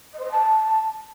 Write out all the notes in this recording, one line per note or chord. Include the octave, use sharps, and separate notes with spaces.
D#5
C5
D#5
A5